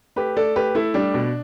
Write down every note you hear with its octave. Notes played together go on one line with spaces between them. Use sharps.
A3 G4 B4
A3 A4 D5
A3 G4 B4
A3 E4 A4
G3 D4
B2